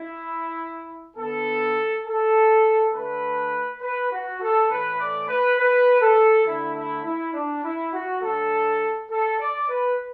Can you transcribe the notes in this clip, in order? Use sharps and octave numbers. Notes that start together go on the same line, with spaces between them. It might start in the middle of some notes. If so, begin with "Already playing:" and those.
Already playing: E4
D3 B3 A4
A4
D3 A3 B4
B4
F#4
A4
A2 E3 A3 B4
D5
B4
B4
A4
D3 A3 E4
E4
E4
D4
E4
F#4
D3 F#3 A3 A4
A4
D5
B4